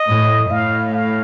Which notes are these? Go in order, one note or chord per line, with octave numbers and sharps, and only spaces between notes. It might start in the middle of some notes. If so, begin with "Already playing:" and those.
Already playing: D#5
A2
A2 F5
F5